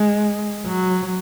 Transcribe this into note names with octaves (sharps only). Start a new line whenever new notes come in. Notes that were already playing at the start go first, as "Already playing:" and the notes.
Already playing: G#3
F#3